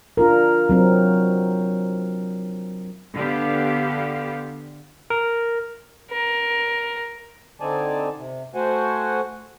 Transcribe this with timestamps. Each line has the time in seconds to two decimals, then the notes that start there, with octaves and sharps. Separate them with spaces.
0.17 D4 F4 A#4
0.69 F#3 C4 A#4
3.15 D3 B3 G4 F5
5.10 A#4
6.11 A#4
7.60 D3 C4 D#4 D5 G#5 A5
8.17 C3
8.55 A3 F#4 C5 F#5 G#5